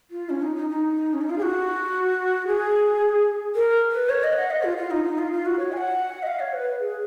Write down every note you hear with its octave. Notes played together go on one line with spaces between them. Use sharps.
F4
C#4
D#4
D#4
D#4
C#4
D#4
F4
G#4
F#4
G#4
A#4
B4
C#5
D#5
F#5
D#5
F4
F4
D#4
D#4
F4
F4
F#4
C#5
G#5
F#5
D#5
F5
C#5
B4
G#4